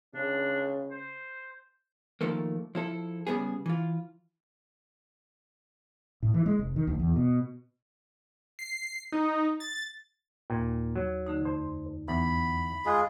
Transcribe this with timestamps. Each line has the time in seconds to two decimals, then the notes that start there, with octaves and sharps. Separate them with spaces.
0.14 C#3 D4
0.91 C5
2.21 D#3 F3 A3 A#3
2.75 F3 E4 A4
3.27 C#3 G3 B3 G#4
3.66 E3 F4
6.22 A2
6.34 E3
6.46 G#3
6.59 F1
6.76 D#3
6.87 D2
6.99 E2
7.16 B2
8.59 C7
9.12 D#4
9.60 A6
10.50 D#2 A#2
10.96 F#3
11.26 D3 A3 D#4
11.45 F2 C5
12.08 E2 B5
12.85 G#3 F4 G#4 B5 F#6